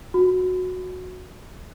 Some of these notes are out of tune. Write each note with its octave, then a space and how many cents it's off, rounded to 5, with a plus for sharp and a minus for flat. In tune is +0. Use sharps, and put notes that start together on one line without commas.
F#4 -10